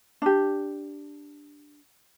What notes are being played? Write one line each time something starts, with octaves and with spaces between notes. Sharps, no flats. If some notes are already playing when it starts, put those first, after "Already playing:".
D4 G4